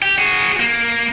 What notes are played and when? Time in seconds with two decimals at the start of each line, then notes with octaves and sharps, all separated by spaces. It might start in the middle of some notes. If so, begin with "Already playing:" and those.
0.02 G4
0.18 F#4 G#4
0.60 A#3